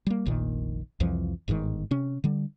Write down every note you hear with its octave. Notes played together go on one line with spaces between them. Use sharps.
G3 A#3
F1 A#1 A#2 D#3
C2 F2 E3 F3
G1 G#2 D3 D#3
C3 C#4
D3 G3